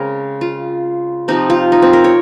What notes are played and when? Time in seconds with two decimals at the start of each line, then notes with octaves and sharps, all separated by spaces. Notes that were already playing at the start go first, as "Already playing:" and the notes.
Already playing: C#3 G#3 C4 G#4 A#4
0.41 F4
1.28 C3 F3 C4 D#4
1.50 F4
1.72 D#4
1.82 C4
1.93 A#4
2.04 C#5